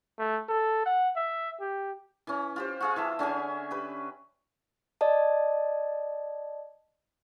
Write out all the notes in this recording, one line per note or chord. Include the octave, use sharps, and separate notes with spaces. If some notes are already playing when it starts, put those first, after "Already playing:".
A3
A4
F#5
E5
G4
E3 C#4
F4 G4 C5
F4 G#4 F5
E3 E5 A5
D3 C#4 G#4 G#5
G4 B4
D5 D#5 A5